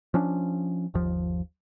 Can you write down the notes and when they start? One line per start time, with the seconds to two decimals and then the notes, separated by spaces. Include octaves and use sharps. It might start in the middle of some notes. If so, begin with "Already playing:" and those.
0.14 F3 C#4 D4
0.94 G1 D#2 F3